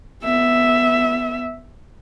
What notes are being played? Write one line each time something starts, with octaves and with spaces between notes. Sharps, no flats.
B3 E5